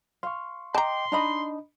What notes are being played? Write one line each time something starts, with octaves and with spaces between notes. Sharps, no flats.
F5 C6 C#6
D#5 G5 A5 A#5 C6 D6
D4 D#4 D#5 B5